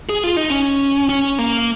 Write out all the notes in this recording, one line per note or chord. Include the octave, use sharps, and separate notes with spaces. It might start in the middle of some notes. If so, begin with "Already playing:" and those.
G#4
F4
D#4
C#4
C#4
A#3